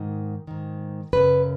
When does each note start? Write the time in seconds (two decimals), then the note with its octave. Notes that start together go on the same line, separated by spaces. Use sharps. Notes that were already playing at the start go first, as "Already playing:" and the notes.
Already playing: G#2 D#3
0.47 G#2 D#3
1.13 F#2 C#3 B4